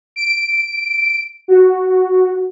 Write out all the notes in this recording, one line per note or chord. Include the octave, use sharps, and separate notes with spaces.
D7
F#4